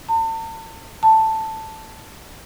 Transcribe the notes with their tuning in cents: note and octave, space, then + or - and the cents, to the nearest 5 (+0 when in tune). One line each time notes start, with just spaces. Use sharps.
A5 +40
A5 +5